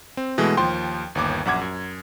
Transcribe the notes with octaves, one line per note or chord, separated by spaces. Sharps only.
C4
B2 E3 G#3 A3
D#2 F3 G5 C6
G1 D#2 D6
A#1 F#2 F#5 D6 G#6
F#2